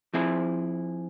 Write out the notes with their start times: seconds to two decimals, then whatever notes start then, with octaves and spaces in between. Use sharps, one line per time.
0.14 F3 C4 E4 G#4